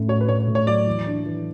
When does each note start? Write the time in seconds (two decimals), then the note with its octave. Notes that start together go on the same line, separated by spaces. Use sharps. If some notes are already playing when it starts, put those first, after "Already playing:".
Already playing: A2 C#4
0.08 F#4 C#5
0.21 B4
0.29 A2 C#5
0.47 A2
0.55 C#5
0.67 F#3 D5
0.87 E3
1.07 D4
1.26 E3